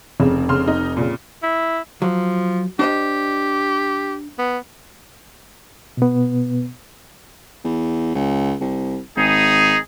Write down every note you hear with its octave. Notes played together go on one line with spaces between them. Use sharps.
F1 C#3
C#3 C6 F6
D#4
A#2 C#3
E4
F3 F#3
D4 G4 C5 D#5
B3
B2 B3
E2
C#2
C2
G#1 D#4 G#4